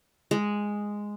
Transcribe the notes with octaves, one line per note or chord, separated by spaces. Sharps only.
G#3